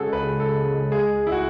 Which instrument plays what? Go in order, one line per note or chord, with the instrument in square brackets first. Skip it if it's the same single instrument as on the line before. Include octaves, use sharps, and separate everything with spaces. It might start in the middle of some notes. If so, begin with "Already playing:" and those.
Already playing: [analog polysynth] C#3 G#3 [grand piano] F#4 G#4 A4
[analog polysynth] C#2 [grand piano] B4
[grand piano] A4
[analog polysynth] C#2
[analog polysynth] G#3 [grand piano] G#4
[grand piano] E4
[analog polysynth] G#3 [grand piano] F#4